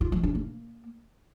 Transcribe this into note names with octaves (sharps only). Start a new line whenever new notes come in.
F4
F3
D4
A#3